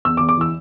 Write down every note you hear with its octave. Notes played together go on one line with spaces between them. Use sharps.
E2 E6
D6
E2
D6
E3 E6